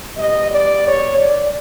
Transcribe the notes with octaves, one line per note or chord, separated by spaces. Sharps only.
B2 G3 D#5
D5
C#5
D5